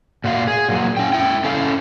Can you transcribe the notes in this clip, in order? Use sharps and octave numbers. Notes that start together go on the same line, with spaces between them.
A#2 F#4 F5
G#4
A#2 F#3
C#4 G5
E4 G5
C#4 A4 F5